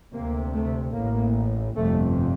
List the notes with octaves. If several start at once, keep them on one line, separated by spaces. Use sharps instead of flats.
D2 C3 A#3
A3
A1 A2 A#3
G1 F2 C3 A3